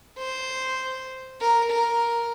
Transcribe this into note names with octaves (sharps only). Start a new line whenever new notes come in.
C5
A#4
A#4